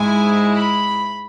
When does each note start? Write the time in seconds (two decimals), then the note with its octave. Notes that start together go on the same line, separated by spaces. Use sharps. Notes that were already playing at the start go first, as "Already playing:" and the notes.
Already playing: G#2 G#3 E4 G#5
0.55 B5